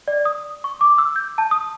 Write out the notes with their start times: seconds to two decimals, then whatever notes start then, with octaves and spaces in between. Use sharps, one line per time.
0.08 D5
0.25 D#6
0.64 C#6
0.81 D6
0.98 E6
1.16 G6
1.38 A5
1.51 D#6